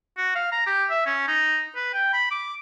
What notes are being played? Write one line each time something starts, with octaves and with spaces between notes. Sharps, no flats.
F#4
F5
A#5
G4
E5
C#4
D#4
B4
G5
B5
D6